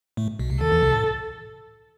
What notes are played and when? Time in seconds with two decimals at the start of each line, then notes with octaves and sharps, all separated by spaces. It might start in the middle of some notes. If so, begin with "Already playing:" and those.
0.17 A2 A3
0.39 B1 B2
0.50 C2 C3
0.61 D#2 D#3 A4
0.72 E2 E3
0.83 C2 C3
0.94 A2